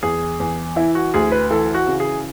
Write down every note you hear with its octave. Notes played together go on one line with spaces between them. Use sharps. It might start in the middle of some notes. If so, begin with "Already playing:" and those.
E2 G#4
E2
E3 E4
F#4
D2 G#4
B4
E3 A4
F#4
C#3
G#4